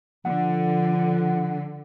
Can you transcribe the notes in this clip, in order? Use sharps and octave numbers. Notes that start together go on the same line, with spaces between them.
D3 F3 F#5